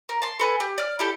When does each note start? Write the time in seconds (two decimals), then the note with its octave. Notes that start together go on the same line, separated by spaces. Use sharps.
0.09 A#4
0.22 A5 C6
0.40 A4 B4 G#5
0.60 G4
0.78 D5 F6
0.99 E4 G4 A4